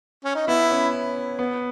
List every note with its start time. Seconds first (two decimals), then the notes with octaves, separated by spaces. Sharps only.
0.24 C#4
0.35 D#4
0.48 B3 E4
0.71 C#4
1.39 B3